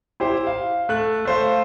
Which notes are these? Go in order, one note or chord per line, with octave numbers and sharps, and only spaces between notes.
E4 G4 C5
F5
A3 F#6
A3 C5 F5